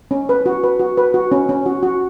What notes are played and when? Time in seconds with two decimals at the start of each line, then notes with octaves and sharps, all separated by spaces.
0.11 C#4
0.29 B4
0.46 F#4
0.64 B4
0.79 F#4
0.97 B4
1.14 F#4
1.32 C#4
1.49 C#4
1.66 F#4
1.83 F#4